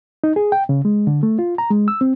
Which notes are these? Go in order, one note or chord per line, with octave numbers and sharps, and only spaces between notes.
D#4
G#4
G5
C#3
G#3
D3
A3
F4
A#5
G#3
E6
C4